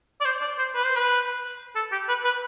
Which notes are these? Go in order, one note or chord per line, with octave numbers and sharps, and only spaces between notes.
D5
C5
D5
C5
B4
C5
B4
A4
G4
B4
B4